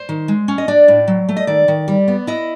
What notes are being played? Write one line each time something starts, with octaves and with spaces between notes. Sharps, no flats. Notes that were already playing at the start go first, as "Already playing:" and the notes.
Already playing: C5
D#3
G#3
C#4
D#5
D4 D5
A2
F#3
A3
D#5
D#3 D5
D#3
G3
B3
E4 D#5